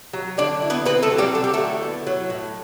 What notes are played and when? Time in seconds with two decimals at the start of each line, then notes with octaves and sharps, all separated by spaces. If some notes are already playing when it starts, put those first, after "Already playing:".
0.13 F#3
0.38 D3 D4 D5
0.62 E4
0.70 B3 B4
0.85 B3 C4 B4
1.03 A3 A4
1.10 F#3
1.18 G3 G4
1.34 D3 A4
1.44 G4
1.54 A3 A4
1.58 E4
1.82 B3
2.07 F#3
2.30 A2